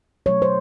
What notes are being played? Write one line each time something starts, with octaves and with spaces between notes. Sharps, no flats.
B2 F#3 A3 C#5
C5